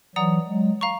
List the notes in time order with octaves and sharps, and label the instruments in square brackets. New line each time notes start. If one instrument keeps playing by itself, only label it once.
[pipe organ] E3 F#3 [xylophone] D5 F#5 A#5 D#6
[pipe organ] F#3 G#3
[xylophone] F5 A#5 C#6